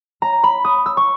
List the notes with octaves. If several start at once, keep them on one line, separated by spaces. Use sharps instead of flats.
A#5
B5
D#6
E6
C#6